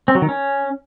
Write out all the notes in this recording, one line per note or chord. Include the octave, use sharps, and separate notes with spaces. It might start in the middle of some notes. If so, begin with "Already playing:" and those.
C4
F#3
D#3
C#4